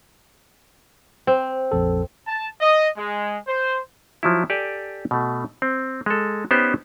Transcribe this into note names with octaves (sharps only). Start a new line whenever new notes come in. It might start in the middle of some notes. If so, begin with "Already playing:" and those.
C4
A#1 F2 A4
A5
D#5
G#3
C5
F3 F#3 E4
G4 A4 D5 G#5
B2 A3
C4
G#3 A4
B3 C#4 D#4 G4 B4 C5